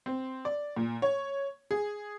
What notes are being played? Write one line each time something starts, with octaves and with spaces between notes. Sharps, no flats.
C4
D5
A#2
C#5
G#4